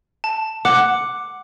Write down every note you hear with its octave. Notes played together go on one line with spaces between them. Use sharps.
A5
F#5 D6